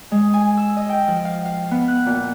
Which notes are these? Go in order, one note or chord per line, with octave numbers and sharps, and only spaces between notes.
G#3
G#5
E6
D#5
G5
F3
F5
F5
B3
F#6
A#2